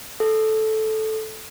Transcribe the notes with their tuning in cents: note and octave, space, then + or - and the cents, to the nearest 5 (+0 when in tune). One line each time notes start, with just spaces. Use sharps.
A4 -10